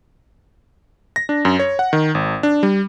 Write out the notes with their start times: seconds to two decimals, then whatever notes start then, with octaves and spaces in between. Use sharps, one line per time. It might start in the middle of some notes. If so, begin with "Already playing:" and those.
1.16 A#6
1.29 D4
1.45 F#2
1.59 C#5
1.79 F#5
1.93 D#3
2.15 G#1
2.43 D4
2.63 G3